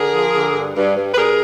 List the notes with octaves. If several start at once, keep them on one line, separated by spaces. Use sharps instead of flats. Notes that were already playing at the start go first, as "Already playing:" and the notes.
Already playing: D3 G#4 A#4
F3
D3
G2
G2
G2
B4
G2 G#4 A#4